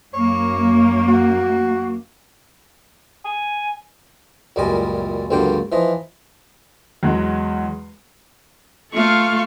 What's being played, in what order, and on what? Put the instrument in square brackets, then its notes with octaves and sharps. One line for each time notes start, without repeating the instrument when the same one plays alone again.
[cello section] F#2 A#3 [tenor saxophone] C#5
[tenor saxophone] F#4
[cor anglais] G#5
[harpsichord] C#2 F#2 A#2 G3 D#5 G#5
C#2 G2 D3 F#3 A#3 G5
E3 F3 D#5
[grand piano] E2 F#3 G#3
[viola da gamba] A3 F4 A4 [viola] F5 C#6